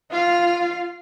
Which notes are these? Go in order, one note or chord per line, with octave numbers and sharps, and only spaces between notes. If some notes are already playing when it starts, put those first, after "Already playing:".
F4 F5